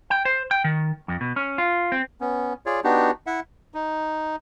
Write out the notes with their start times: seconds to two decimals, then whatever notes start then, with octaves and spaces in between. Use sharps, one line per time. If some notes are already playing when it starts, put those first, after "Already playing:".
0.10 G5
0.25 C5
0.51 G5
0.64 D#3
1.08 F2
1.21 B2
1.36 C#4
1.58 F4
1.92 C4
2.20 B3 C#4
2.66 F4 G#4 C#5 D5
2.84 B3 D4 D#4 F#4 G4
3.26 E4 E5 F#5
3.74 D#4